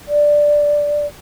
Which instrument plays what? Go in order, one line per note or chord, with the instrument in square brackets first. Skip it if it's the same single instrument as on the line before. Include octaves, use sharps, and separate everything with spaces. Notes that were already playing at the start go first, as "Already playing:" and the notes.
[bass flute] D5